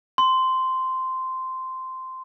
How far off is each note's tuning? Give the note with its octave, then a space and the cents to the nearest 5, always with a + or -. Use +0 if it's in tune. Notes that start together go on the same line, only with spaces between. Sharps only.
C6 -10